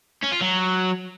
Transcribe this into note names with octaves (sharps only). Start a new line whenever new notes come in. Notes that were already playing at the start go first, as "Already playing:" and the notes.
C#4
F4
F#3